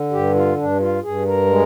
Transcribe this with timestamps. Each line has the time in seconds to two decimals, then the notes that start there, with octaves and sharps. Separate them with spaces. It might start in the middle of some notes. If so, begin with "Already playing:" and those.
Already playing: D3
0.11 G2 G4
0.34 F4
0.57 G2 D4
0.80 F4
1.03 G2 G#4
1.26 A#4
1.48 G#3